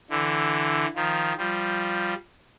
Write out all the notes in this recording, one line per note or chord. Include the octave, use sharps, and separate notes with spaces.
D3 E3
D#3 F3
F3 G3